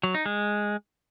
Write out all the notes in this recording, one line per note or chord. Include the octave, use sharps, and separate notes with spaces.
F#3
D#4
G#3